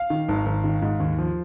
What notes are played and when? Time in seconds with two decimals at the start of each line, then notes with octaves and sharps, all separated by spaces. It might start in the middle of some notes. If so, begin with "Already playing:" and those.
Already playing: F5
0.10 D#3
0.29 G#1
0.46 G#1
0.64 D#3
0.82 G#2
1.00 D#2
1.19 F3